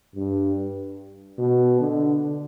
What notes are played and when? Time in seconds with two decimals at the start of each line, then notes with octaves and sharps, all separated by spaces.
0.15 G2
1.39 B2
1.80 D3